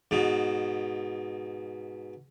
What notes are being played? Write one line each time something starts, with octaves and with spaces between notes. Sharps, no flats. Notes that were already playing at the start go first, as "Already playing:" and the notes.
G#2 B2